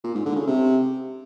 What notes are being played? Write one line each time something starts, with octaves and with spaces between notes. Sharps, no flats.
A#2
G#2
D3
C#3
C3